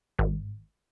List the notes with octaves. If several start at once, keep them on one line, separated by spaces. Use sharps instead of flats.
G#1